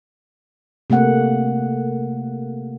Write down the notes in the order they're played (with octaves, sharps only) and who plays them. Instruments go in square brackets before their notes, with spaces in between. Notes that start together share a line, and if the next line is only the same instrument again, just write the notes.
[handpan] C3 A3 A#3 F#5